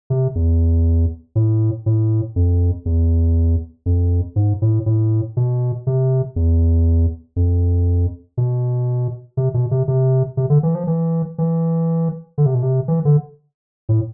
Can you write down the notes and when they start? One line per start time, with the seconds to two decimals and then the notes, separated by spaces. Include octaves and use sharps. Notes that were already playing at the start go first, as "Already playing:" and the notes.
0.10 C3
0.35 E2
1.35 A2
1.86 A2
2.36 F2
2.86 E2
3.86 F2
4.36 G#2
4.62 A2
4.86 A2
5.37 B2
5.87 C3
6.36 E2
7.36 F2
8.37 B2
9.37 C3
9.54 B2
9.71 C3
9.88 C3
10.37 C3
10.50 D3
10.63 E3
10.75 F3
10.87 E3
11.38 E3
12.38 D3
12.46 C3
12.55 B2
12.62 C3
12.88 E3
13.05 D3
13.89 A2